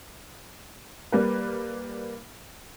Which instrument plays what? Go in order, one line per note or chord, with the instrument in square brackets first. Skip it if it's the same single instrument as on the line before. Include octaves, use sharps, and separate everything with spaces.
[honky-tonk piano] G3 A#3 B4